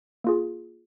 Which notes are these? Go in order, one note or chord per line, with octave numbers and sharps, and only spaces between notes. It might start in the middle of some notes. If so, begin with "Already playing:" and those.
A#3 F4 G#4